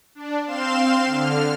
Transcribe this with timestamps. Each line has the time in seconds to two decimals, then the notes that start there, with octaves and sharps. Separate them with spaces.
0.15 D4
0.47 C4 F5 C6 E7
1.05 D3 F6